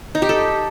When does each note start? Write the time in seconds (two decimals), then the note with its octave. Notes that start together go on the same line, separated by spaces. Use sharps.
0.15 D#4
0.22 G4
0.29 A4